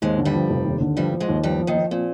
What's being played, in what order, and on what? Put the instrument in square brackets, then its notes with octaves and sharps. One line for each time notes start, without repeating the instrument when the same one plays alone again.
[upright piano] D#2 [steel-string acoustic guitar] G#2 G#3
[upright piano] D3
[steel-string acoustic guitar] G2 G3
[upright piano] F3
F1
D#2
D3
[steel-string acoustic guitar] G2 G3 [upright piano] F3
[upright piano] F3
[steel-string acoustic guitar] G#2 G#3
[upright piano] D#2
[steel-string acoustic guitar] G2 G3 [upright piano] F3
[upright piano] F3
[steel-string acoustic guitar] D#2 D#3
[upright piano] F3
[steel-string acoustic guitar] A#2 [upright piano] C4